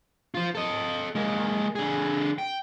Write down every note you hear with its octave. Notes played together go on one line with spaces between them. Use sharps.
F4 C5
A4 D#5
G#3 A#3
D3 G#4
G5